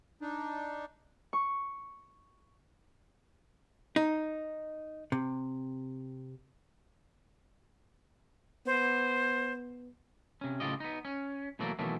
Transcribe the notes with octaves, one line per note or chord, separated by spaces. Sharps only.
D4 D#4
C#6
D#4
C3
B3 C5
C3 C#4
A2 C#3 F4 G4 D#5
B3 D#4
C#4
B2 E3 F#3 A3 A#3
B2 D#3 E3 F#3 A3 A#3